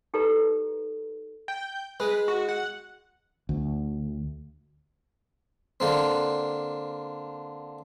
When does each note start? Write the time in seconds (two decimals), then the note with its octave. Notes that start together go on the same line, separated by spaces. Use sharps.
0.14 D#4 G4 A4 B4 D5 A#5
1.48 G5
2.00 G#3 B4
2.28 F#4
2.48 F#5
3.49 D2
5.80 D3 A#3 C4